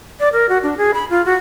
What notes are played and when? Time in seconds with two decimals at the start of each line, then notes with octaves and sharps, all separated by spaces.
0.20 D5
0.33 A#4
0.49 F#4
0.63 D4
0.78 G#4
0.94 B5
1.10 F4
1.26 F#4